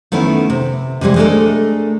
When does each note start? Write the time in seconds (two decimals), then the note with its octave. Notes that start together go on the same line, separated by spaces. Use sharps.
0.12 D#3 A3 B3 C#4 E4
0.50 C3
1.01 C3 E3 G3 G#3
1.16 G#3 A3 D4 G4 A4 A#4